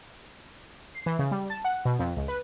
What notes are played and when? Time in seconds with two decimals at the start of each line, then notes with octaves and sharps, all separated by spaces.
0.95 C7
1.06 E3
1.19 C#3
1.31 G3
1.50 A5
1.65 F#5
1.85 B2
1.99 F2
2.17 C#2
2.28 B4